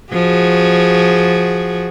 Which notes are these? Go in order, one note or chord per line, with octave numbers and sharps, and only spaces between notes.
F3 F#4 G#4